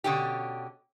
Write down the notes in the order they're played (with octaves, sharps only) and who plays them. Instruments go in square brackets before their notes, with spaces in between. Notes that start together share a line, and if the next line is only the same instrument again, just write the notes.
[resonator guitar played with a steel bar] B2 D3 C#4 G4